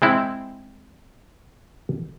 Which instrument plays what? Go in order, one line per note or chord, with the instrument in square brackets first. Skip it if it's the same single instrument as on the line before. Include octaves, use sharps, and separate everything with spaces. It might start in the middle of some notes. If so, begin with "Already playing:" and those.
[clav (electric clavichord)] G#3 C4 E4